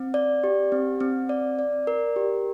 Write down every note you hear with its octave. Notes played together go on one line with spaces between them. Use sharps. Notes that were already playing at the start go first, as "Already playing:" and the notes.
Already playing: C4
D5
G4
C4
C4
D5
D5
A#4
G4